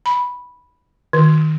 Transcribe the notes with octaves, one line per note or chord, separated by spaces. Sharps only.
B5
D#3